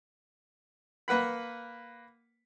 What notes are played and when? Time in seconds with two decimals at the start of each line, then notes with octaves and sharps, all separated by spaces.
1.08 A#3 B4 F#5 B5